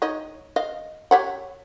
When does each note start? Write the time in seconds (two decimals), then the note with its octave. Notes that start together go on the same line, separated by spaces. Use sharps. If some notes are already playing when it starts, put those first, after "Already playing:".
0.02 D#4 C#5 D#5
0.56 D#5 F5
1.11 G4 C#5 F#5